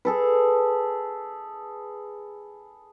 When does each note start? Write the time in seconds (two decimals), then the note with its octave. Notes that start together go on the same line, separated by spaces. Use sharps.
0.05 G#4 A4 B4